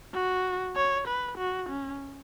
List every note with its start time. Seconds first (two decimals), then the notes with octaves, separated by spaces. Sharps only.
0.14 F#4
0.76 C#5
1.07 B4
1.38 F#4
1.69 C#4